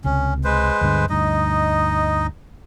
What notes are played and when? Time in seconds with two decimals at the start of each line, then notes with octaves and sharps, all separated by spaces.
0.04 C#2 C3 C#4
0.44 G#3 B4 C5
0.81 D2 G2 D3
1.10 D2 G2 D#4 D#5